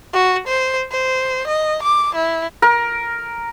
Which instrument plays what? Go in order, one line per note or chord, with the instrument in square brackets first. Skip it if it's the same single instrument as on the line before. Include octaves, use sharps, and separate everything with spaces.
[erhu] F#4
C5
C5
D#5
D6
E4
[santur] A#4